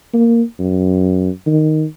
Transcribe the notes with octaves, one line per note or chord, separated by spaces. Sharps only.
A#3
F#2
D#3